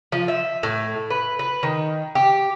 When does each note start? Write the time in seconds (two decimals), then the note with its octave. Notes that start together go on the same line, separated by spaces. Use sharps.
0.12 F3
0.28 E5
0.63 A2
1.10 B4
1.39 B4
1.63 D#3
2.15 G4